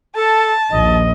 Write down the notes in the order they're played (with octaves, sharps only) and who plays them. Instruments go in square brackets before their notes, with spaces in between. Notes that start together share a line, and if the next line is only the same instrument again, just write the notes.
[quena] A4 [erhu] A5
[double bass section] A#1 D#2 [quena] D#5